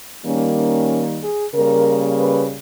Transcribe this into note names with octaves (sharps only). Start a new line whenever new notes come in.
D#3 G3 A#3 C#4
C#4
G#4
C#3 G3 A#3 A#4
B4